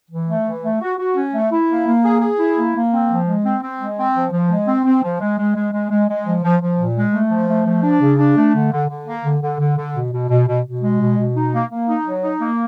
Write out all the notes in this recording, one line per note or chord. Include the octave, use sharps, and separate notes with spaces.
E3
A3
E3
A3
F#4
F#4
C#4
A3
E4
A#3
A#3
G#4
G#4
E4
A#3
A#3
C4
F3
G#3
C4
C4
G#3
C4
F3
F3
G#3
C4
C4
F3
G#3
G#3
G#3
G#3
G#3
G#3
F3
F3
F3
A#2
G#3
A3
F3
A3
F3
D4
C#3
D4
A3
D3
D3
D3
A#3
D3
D3
D3
D3
B2
B2
B2
B2
B2
G#3
B2
B2
D#4
A#3
A#3
D#4
F#3
D#4
A#3